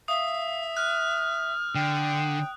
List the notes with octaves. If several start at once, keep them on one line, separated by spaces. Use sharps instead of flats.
E5 F5 D#6
F6 F#6
D3 G5